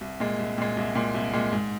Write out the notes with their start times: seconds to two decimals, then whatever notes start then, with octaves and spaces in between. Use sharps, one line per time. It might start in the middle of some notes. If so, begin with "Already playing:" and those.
0.01 C2
0.20 A#2 G#3
0.39 C2
0.58 A#2 G#3
0.77 C2
0.95 A#2 G#3
1.14 C2
1.33 A#2 G#3
1.52 G#2